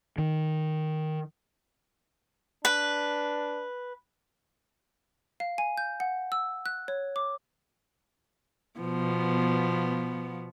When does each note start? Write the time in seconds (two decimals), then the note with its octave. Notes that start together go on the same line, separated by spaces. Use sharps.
0.18 D#3
2.65 D4 B4
5.40 F5
5.58 G#5
5.78 G6
6.00 F#5
6.32 E6
6.66 F#6
6.88 C#5
7.16 D6
8.80 B2 F3 B3